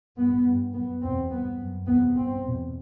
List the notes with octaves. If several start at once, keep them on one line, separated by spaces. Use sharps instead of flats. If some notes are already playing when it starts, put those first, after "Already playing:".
G2 B3
G2
F#2 B3
E2 B2 C4
G2 B3
F#2
E2 C3 B3
G2 C4
E2 B2